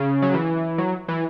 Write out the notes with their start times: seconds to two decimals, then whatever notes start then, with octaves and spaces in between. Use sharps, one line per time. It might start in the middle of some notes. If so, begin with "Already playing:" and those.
Already playing: C#3
0.22 F#3
0.34 E3
0.78 F#3
1.08 E3